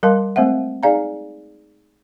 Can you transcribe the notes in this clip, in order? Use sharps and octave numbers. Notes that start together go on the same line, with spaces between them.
G3 A#4 F5 A5 C6
G#3 A3 C4 C5 E5 F#5
D#4 G#4 D5 F5 G#5 A#5